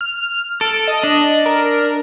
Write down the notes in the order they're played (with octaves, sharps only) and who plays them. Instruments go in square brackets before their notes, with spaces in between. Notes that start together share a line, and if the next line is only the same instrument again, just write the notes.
[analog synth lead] F6
[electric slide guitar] A4 [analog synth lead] D7
[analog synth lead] D#5
[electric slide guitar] D4
[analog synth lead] A#4